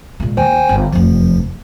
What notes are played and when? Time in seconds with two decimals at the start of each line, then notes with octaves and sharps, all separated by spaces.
0.20 A#2 G#3
0.37 D#2 C5 G5 G#5
0.69 G1
0.93 F1 E2 F3